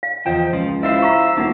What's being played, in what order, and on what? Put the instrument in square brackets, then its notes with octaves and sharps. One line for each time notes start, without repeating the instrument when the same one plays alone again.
[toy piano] F5
[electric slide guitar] E2 C5 G5 [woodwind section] C#3 D#5 [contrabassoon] F3
[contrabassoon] C#2 [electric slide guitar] F3
[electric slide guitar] E4 F4 C5 [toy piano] D#5 [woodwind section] E6
[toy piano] F5 A#5 C#6
[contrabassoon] E1 [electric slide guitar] A#3 [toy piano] D#4 F4 F#5